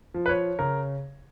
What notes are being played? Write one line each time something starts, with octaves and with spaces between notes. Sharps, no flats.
F3
B4
C#5
C#3 A#4